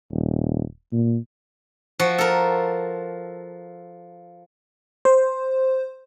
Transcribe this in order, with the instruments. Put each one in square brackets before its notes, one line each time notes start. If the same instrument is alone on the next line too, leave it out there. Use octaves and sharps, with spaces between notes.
[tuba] D#1
A#2
[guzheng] F3 F#4
A4 A#4
[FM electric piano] C5